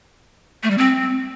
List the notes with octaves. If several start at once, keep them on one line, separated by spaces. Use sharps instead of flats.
A3
G3
C4